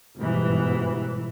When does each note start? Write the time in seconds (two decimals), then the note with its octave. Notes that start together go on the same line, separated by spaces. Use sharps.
0.18 G1 G#2 B2 E3